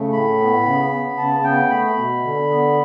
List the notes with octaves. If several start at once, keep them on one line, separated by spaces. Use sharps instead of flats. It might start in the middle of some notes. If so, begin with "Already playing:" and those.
Already playing: C#3 A3
A2 B5
B3
C#3
B3
C#3 A5
B3 G5
A3 B5
B2
D3
B3